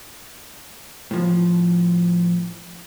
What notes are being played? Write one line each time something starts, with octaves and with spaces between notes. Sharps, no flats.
A2 F3